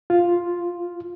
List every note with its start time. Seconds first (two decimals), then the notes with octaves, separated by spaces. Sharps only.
0.10 F4